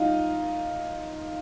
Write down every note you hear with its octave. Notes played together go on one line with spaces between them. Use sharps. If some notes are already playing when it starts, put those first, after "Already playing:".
Already playing: D#4 F4